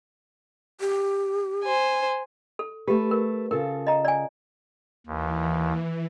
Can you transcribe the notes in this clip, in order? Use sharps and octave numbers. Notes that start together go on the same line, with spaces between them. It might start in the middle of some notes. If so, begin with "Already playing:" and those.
G4
C5 G#5
A4
A3 G4 B4
A#4
C#3 F4 A4 A#4
D#5 A#5
D5 G#5
D#2 E3